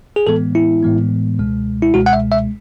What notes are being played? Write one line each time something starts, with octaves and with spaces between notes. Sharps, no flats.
G#4
A2 E3 G#3 B3 A4
E4
A2 E3 G#3 B3
C#2 B2 G#3
E4
C#2 B2 G#3 F#4
F#5
E5
E5